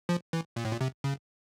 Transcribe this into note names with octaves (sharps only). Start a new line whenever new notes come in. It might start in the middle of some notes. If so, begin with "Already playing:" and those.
F3
E3
A#2
A2
A#2
C3
C#3